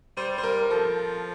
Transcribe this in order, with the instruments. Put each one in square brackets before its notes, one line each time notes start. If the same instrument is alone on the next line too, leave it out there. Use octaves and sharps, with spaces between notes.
[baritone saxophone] G3 [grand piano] C5
[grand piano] C5
A#4
[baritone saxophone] F3 [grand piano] A4